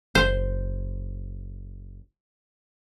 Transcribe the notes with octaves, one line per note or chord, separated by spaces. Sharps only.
F#1 C5